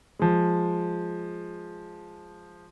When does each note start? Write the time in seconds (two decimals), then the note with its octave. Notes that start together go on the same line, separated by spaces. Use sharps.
0.19 F3 G#3